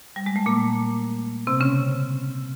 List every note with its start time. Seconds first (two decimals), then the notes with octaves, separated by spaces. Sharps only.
0.16 G3
0.26 G#3
0.36 A3
0.46 A#2 A#3
1.47 C3 C4
1.60 C#3 C#4